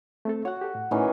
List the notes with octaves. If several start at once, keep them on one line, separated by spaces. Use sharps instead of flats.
A3 C4 A4
F#4 C#5 F#5
G4 A4
A2
A2 D#3 E3 A3 C#4